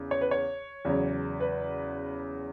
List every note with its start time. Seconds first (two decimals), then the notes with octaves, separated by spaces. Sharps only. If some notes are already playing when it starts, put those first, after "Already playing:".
Already playing: E2 C#3
0.11 C#5
0.21 B4
0.31 C#5
0.85 E2 C#3 F#3
1.40 B4